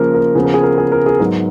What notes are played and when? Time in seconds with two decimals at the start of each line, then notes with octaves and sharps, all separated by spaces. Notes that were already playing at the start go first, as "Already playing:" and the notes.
Already playing: C#3 F3 A#3 A#4
0.14 A#4
0.35 C#3 F3 B3 B4
0.45 A#4
0.54 G#4
0.63 A#4
0.78 G#4
0.92 A#4
1.06 G#4
1.20 G#2 F#3 B3 A#4